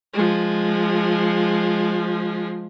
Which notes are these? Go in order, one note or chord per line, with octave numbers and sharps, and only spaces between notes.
F3 G#3